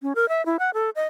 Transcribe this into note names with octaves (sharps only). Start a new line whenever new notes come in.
C#4
A#4
E5
E4
F#5
A4
D#5